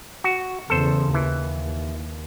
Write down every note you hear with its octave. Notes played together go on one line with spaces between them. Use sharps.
F#4
E2 C#3 A4 C5
D#2 E3